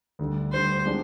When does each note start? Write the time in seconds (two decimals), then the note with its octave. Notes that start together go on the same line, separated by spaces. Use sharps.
0.19 D2 D3 G3
0.52 D2 D3 G3 C5
0.85 D3 F3 G#3 D4 G4